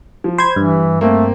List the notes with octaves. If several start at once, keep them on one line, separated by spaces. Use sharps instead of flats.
F3
C5 B5 G#6
G2 E3
A3 A#3 C4